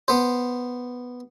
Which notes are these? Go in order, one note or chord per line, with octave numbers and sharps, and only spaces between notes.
B3 C5